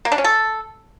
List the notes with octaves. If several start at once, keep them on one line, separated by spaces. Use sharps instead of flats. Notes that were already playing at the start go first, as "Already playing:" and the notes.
A#3
D4
C#4
A4